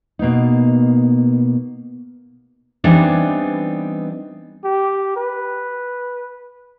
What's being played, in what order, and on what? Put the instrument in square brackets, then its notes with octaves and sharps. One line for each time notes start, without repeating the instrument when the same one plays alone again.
[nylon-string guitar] B2 A#3 B3 D#4
[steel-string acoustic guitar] E3 G3 B3 C4 D4 D#4
[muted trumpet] G4
B4